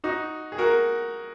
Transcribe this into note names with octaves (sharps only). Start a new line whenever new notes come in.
D#4 F#4
G#4
F#4 A#4